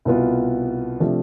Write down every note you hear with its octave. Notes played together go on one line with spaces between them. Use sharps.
C2 B2 B3 F4
C3 F3 A3 D4